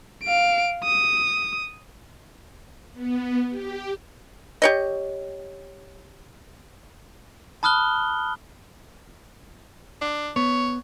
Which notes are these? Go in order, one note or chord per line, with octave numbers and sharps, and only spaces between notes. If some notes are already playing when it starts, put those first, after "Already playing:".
F5 D7
D#6
B3
G4
G4 C#5 D#5
A5 B5 D#6 F6 F#6 G7
D4
B3 C#5